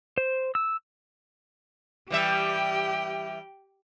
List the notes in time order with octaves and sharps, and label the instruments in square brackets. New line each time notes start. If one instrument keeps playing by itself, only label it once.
[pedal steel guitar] C5
E6
[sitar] E3 G3 E5 [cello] G4 G5